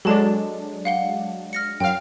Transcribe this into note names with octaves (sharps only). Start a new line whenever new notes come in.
F#3 G#3 D4 A4 A5
F5 F#5 G7
F6 A#6 C#7
F#2 F5 G5 F6